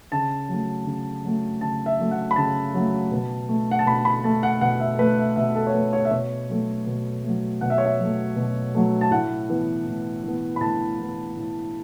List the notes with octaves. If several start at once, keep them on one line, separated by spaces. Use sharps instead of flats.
C#3 A5
F#3 A3
C#3
F#3 A3
C#3 A5
E5
F#3 A3
F#5
B5
C#3 A5
F#3 A3
B2
A3
F#5
A5
B2 B5
B5
A3 A5
F#5
B2 F#5
E5
A3 B4
E5
B2 E5
A4
C#5
A3 B4
C#5
E5
B2 C#5
F#3 A3
B2
F#3 A3
B2 F#5
E5
C#5
E5
F#3 A3
B2
F#3 A3
A5
A2 F#5
E3 B3
A2
E3 B3
B5
A2 A5
E3 B3
A2